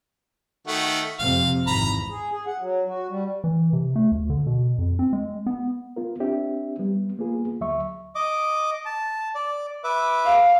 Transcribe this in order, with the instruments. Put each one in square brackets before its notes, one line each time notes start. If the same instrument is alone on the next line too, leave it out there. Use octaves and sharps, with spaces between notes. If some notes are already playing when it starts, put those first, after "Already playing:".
[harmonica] D#3 A3 F#4
[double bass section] F2 C3 [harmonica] F5
[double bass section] G#1 E2 [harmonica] A#5 B5
[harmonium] G#4
G#4
F#5
F#3
F#4
G3
[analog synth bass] E3
C3
A3
D2
D3
B2
F2
C4
G#3
B3
[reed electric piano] B3 F4 A#4
C4 D4 G4 E5
G3 B3
A#3 B3 F4 G#4 B4
D2 F#3 E5 C#6
[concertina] D#5 D6
A5
D5
B4 E5 D6
[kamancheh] F5